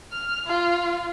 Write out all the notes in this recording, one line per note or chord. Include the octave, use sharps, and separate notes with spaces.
F6
F4